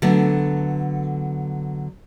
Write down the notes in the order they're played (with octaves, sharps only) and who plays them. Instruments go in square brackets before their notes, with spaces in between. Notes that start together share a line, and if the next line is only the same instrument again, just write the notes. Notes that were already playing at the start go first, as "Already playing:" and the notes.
[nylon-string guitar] D3 F#3 A3 B3